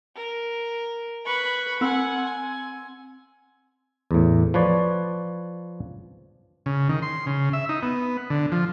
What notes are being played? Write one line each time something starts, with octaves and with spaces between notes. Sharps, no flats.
A#4
B4 B5 C#6
C4 F#5 G#5 C6 E6
G#5
E2 A2
F3 B4 C#5 D5
C#3
D#3
C6
C#3
E5
D#4
B3
D3
F3